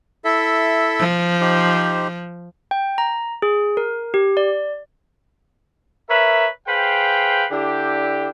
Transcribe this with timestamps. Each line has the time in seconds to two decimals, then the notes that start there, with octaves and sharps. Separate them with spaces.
0.25 E4 A4 E5
1.00 F3
1.41 D#4 G4 C5
2.71 G5
2.98 A#5
3.42 G#4
3.77 A#4
4.14 G4
4.37 D5
6.10 A#4 B4 C#5 E5
6.68 G#4 B4 C5 F5 G5
7.51 D3 D4 E4 G4